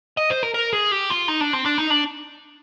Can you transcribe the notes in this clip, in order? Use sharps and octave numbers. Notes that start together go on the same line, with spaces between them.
D#5
C5
A#4
A#4
G#4
G4
F4
D#4
D4
C4
D4
D#4
D4